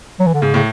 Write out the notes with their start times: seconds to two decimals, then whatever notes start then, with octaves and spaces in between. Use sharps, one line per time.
0.20 F#3
0.26 E3
0.34 D3
0.42 G#2 C#3
0.54 A2 C#3